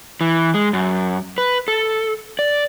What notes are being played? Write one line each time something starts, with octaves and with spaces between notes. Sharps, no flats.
E3
G#3
F#2
B4
A4
D5